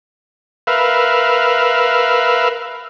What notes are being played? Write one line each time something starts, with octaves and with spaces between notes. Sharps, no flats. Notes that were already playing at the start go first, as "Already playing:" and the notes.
A#4 B4 E5 F5